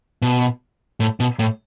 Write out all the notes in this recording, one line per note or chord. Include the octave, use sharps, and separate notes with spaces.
B2
A2
B2
A2